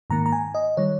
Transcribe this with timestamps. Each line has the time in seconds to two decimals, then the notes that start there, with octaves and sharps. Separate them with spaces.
0.10 G#2 D#3 A#3 A#5
0.26 A#5
0.32 G#5
0.55 D#5
0.77 D#3 G3 C#5